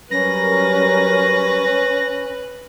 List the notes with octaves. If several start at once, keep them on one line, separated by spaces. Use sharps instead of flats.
F#3 G3 C#4 A#4 B4 A#6